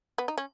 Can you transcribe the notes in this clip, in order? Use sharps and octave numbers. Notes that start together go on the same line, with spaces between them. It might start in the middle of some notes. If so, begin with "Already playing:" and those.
B3
D#4
C#4